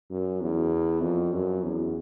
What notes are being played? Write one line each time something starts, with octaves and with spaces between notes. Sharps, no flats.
F#2
E2
F2
F#2
E2